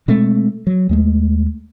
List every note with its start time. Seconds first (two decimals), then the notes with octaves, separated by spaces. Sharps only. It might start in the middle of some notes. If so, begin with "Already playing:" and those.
0.08 B2 G#3 A3 C4
0.67 F#3
0.89 D#2 G#3 A3